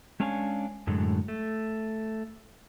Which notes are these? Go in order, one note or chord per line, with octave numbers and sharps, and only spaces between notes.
G#3 C#4 D4 C#5 F5 G#5
F#2 A2 D3 F#3 G#3
A3